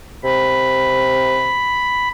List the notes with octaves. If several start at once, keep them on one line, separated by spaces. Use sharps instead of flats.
C3 B5